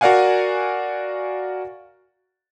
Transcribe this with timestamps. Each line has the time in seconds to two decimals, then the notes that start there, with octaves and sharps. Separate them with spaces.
0.01 F#4 A#4 D5 F5 F#5 G#5